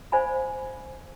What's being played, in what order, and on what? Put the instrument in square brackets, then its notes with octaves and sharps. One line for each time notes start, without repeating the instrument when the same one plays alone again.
[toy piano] C5 D5 F5 G#5 B5